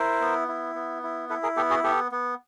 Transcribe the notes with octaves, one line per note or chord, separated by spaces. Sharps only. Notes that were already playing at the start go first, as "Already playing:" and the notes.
Already playing: E4 A#4 C5
B3
E4
B3
E4
E4 A4 B4
G#4 A#4
B3 G4 A4
F#4 G#4
B3 G4 A4
B3